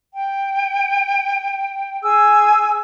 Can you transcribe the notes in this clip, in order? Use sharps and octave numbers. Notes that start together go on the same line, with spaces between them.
G5
G#4 G#5 E6